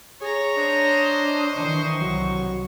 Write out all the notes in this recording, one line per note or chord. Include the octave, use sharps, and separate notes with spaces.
G#4 C#5 A#5
D4 C5 D#5
D#3 E3 C#6
C2 F#3